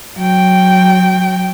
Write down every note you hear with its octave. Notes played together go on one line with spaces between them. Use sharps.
F#3 G5